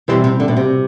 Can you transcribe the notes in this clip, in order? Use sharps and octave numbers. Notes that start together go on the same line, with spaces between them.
B2 E3 G3 C4 E4
C3
D3
B2
C3